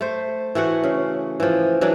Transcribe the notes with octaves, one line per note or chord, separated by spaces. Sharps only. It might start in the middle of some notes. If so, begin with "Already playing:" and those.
A3 C5
E3 A3 F#4 F#5
C#3
E3 F3
E3 F#3 D4